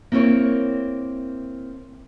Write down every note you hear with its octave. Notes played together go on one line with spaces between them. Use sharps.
A#3 C4 E4 A#4 C#5